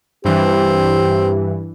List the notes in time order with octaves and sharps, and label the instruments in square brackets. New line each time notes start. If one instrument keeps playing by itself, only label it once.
[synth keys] G2 E3 [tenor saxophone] C4 [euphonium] G4